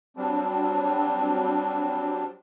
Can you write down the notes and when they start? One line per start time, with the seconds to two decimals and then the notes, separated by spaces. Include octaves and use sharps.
0.17 F#3 G3 C4 D4